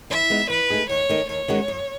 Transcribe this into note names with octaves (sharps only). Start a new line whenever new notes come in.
E3 E5
G#3 B3 D#4
E3 B4
A3 D#4 G#4
D#2 C#5
D#3 A3 D#4
D#2 C#5
D#3 G#3 C#4 F#4
F#2